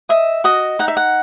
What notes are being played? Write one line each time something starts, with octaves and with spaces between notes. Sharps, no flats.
D#5 E5
F#4 D#5
D#4 F#5
E5
F#5